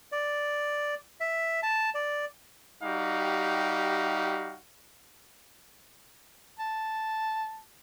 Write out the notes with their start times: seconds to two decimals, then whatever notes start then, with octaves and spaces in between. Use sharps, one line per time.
0.12 D5
1.21 E5
1.63 A5
1.95 D5
2.83 G3 D#4 F#4 G4 F5
6.59 A5